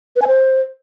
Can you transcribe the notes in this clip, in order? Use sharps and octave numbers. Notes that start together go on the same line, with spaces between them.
B4
G#5
C5